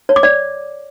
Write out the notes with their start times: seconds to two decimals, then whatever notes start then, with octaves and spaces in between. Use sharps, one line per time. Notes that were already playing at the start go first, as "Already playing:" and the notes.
0.09 C#5
0.16 D6
0.23 D5